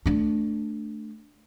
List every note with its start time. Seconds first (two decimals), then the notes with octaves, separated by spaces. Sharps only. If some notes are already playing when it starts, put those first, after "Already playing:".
0.06 A3 D4